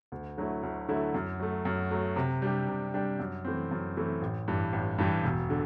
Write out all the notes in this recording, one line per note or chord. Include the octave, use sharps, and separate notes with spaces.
D2
D3 F#3 A3 E4
D2
D3 F#3 A3 E4
F#2
F#3 A3
F#2
F#3 A3
C3
G3 D4 G4
C3
G3 D4 G4
F#2
E3 A3 C4
F#2
E3 A3 C4
A1
G2 E3 G3
A1
G2 E3 G3
E1
D3